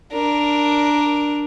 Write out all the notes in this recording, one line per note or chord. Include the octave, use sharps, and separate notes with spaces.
D4 A#4